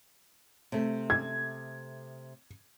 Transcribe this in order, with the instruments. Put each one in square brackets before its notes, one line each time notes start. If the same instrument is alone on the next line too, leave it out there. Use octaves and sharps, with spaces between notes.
[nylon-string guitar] C3 A3
[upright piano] G#6